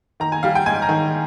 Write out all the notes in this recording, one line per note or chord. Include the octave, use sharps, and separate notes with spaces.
D#3 A#5
G#5
G3 F5
G5
G#2 G#5
A#5
D#3